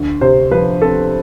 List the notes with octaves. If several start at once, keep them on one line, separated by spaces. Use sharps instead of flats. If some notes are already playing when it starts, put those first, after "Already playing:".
Already playing: D2
C3 C5
F3 B4
C4 A4